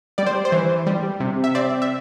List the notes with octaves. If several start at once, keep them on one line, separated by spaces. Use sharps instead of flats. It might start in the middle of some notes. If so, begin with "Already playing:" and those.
G3 D5
C5
C5
E3
G3
C3
E5
C4 D5
E5